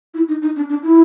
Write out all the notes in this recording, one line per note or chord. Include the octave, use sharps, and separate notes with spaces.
E4
D#4
D#4
D4
D4
E4